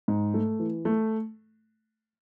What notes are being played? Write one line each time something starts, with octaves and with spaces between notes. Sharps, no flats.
G#2
A3
E3
A3